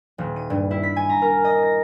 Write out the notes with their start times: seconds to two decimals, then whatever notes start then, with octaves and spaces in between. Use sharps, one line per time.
0.18 D#1
0.36 D#7
0.50 G2
0.71 E4
0.83 B6
0.96 G#5
1.09 A#5
1.22 A#4
1.44 D#5
1.63 A#6